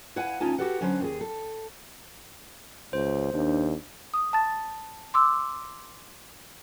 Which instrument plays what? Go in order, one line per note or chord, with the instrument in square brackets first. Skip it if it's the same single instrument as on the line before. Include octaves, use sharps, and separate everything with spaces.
[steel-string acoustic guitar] E4 B4 F5 F#5 G#5
D2 C#4 D#4 F4 G#5 A5
F#4 G4 A4 B4 F#5
D3 F#3 C#4 B4 C5
D#2 F#4 G#4
A4
[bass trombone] C#2 [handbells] C5
[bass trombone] D#2 [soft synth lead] D4
[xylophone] D#6
A5 A6
C6 D6 E6